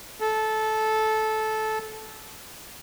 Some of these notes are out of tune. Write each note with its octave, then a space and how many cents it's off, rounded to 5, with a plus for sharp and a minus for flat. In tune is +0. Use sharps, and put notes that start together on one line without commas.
A4 -15